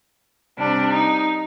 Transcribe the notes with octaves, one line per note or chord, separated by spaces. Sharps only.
C3 G3 D4
D#4